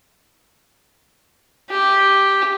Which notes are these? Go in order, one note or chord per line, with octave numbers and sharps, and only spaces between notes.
G4